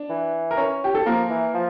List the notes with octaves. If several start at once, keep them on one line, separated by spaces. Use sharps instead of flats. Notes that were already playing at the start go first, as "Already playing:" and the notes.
Already playing: D4
E3
A#4
C#4 C#5
G4
A4
F3 A#3 A#4
E3
F3